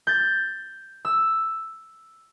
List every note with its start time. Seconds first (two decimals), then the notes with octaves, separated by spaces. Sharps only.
0.07 G6 A6
1.05 E6